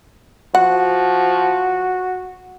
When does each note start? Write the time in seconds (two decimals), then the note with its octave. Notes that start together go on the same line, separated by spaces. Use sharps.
0.55 F3 F#4 F#5